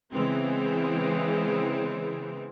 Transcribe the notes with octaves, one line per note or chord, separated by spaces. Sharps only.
C#3 E3 G#3 B3 C4